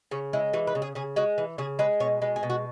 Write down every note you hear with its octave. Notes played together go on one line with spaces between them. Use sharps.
C#3 C#4
G#3 E4
E3 F#4
B4
C#3
G#4
C#3 G#4
G#3 F#4
E3
C#3 G#4
G#3 B4
B2 C#5
G#3 B4
G#4
B2
F#4